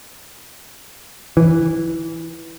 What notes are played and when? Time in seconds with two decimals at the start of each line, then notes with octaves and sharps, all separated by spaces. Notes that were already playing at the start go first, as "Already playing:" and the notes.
1.37 E3